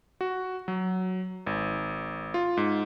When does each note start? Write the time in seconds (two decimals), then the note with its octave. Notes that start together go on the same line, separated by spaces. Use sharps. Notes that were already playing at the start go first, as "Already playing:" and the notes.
0.21 F#4
0.68 F#3
1.46 G#1
2.34 F4
2.57 G#2